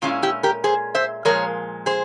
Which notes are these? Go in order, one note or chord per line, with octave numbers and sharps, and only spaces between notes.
A#2 G#3 C#4 E4 F4
E4 G4
G4 A#4
G#4 C5
C5 E5
A#2 F3 G#3 A#4 C#5
G#4 C5